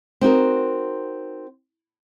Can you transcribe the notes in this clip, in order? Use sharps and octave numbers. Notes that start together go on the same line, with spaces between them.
C4 D#4 F#4 A#4